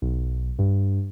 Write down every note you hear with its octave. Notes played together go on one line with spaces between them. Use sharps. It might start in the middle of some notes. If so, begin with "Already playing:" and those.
B1
G2